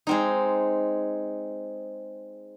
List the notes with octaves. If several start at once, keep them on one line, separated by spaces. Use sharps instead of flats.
G#3 C4 D#4